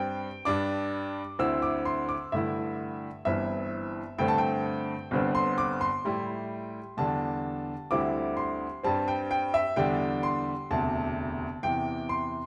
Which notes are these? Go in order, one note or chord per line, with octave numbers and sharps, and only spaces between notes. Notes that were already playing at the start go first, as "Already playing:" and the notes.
Already playing: G2 G3 C4 G5
G2 G3 D4 D6
D2 D3 C4 E4 E6
D6
C6
D6
G2 D3 A3 E4 E5
G1 G2 E3 C4 E4 E5
G2 D3 A3 C4 G5
A5
G5
G1 G2 D3 C4
C6
D6
C6
A2 G3 E4
E2 D3 G3 D4 A5
D2 D3 G3 C4 E4 D6
C6
G2 G3 C4 A5
G5
G5
E5
E2 D3 G3 D4 G5
C6
E1 D2 C3 A5
E2 C3 E3 G5
C6